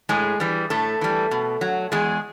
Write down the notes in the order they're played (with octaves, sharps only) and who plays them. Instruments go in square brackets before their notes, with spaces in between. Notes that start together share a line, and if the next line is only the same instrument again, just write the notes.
[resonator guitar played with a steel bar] A2 G#3 G#4
E3 G3
A2 A3 A4
E3 G3
B2
F#3
E2 G#3 G#4